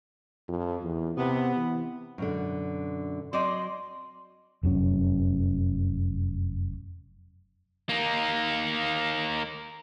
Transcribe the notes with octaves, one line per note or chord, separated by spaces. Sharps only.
F2
E2
C3 B3
E3
F#2 B2 D3
F#3 C4 D5 D#5 C6
F1 F#2 C#4
A#3 D#4